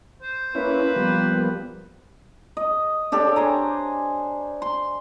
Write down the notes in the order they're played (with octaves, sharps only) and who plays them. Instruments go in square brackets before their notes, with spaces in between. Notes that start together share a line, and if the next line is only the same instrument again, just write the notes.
[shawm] C5
[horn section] A#3 B4 [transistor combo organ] C#4 E4
[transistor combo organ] F3 G3 B3
[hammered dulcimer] D#5
D4 G4 A4 C#5
C5 G#5 A#5
C6